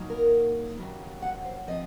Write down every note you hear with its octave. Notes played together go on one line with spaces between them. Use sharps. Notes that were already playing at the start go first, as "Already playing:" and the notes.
Already playing: A#2 F#3 A#3 D#4
A#4
D#2 C#3 F#3
F#5
C5
F3 C4 D#5